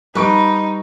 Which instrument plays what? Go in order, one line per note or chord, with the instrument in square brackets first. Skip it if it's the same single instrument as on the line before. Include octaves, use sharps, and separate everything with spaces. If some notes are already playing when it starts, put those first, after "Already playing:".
[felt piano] G3 C#6 D7 [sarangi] D#4 [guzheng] B4